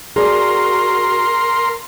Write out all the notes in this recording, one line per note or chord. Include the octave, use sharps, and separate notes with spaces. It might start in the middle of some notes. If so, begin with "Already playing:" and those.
F#4 G#4 A#4 D5 C6